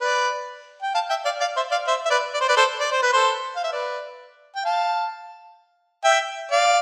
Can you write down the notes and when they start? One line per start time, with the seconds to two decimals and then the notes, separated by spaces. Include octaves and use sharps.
0.01 B4 D5
0.82 G5
0.94 F5 A5
1.09 E5 G5
1.25 D5 F5
1.40 D5 F5
1.56 C5 E5
1.71 D5 F5
1.87 C5 E5
2.05 E5
2.10 B4 D5
2.33 D5
2.41 C5
2.48 B4 D5
2.57 A4 C5
2.80 D5
2.91 C5
3.02 B4
3.13 A4 C5
3.55 F5
3.64 E5
3.72 B4 D5
4.55 G5
4.65 F5 A5
6.04 E5 G5
6.51 D5 F5